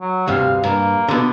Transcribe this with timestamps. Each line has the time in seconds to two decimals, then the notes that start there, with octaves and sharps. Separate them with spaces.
0.01 F#3
0.27 D2 G2 C3 F5
0.64 G2 A#3
1.08 B2 D3